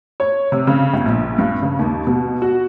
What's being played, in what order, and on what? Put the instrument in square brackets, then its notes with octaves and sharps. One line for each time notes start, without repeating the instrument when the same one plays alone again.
[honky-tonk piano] C#5
C3
C#3
G1
A#1
G2
C#3
D#2
B2
F#4